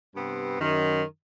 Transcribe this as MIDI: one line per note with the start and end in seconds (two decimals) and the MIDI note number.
0.16 0.59 43
0.16 0.59 48
0.16 0.59 59
0.16 0.59 60
0.59 1.03 42
0.59 1.03 51